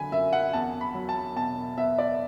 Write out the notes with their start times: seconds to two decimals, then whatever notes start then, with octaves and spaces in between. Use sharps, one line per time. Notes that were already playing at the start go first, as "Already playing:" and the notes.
Already playing: D3 F#3 G#5 B5
0.12 F#2 E5
0.33 F#5
0.53 E2 A5
0.81 B5
0.94 F#3
1.09 A5
1.36 B2 A5
1.77 B3 E5
1.98 D5